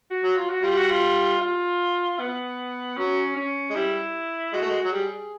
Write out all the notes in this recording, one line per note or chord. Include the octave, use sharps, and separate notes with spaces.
F#4
F#3
F4
F#4
G3 F4
F#4
F4
F4
B3
F#3 C#4
C#4
G#3
G3 E4
G#3 F#4
A3
G#3
F#3
G3 G#4